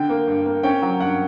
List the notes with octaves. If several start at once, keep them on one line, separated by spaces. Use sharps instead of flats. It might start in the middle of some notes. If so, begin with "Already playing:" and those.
Already playing: D3 G5
A#3
G2
A#3
C#4 G5
F#3
G2 F#5